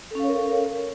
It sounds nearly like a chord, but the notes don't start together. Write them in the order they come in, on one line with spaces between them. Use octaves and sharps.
A4 C#4 F5 C#5 A#4